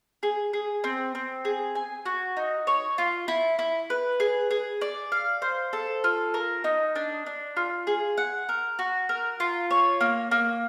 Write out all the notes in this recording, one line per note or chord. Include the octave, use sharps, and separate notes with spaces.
G#4
G#4
C4
C4
G#4
G#5
F#4
D#4
C#5
F4
E4
E4
B4
G#4
G#4
D5
F5
C5
A4
F4
A#4
D#4
D4
D4
F4
G#4
F#5
A#4
F#4
A#4
F4
C#5
A#3
A#3